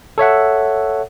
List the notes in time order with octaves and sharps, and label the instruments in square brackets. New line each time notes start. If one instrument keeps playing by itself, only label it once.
[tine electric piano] A4 C#5 E5 F#5